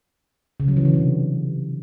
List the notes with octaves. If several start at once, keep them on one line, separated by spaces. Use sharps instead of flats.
C#3
F#3
E3
D3
C3